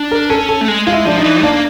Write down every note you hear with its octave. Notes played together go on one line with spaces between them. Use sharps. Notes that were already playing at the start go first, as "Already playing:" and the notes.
Already playing: D4
A#4
C#4 A4
A4
A3
G#3
G#3 F4
E4
F3 D4
D#4
E3
A#3 D4